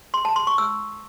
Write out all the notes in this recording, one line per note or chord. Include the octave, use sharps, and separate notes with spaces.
C6
A5
C6
C#6
E6